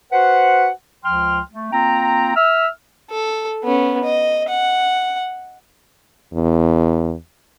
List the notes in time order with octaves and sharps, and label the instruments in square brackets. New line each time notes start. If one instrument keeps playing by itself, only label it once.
[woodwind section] F#4 B4 C5 F#5
C#2 F3 G5 C6 F6
A3
A#3 C4 F4 G5 A#5
E5 E6 F6
[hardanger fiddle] A4
B3 C#4
D#5
F#5
[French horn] E2